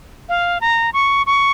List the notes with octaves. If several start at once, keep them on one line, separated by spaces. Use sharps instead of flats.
F5
A#5
C#6
C#6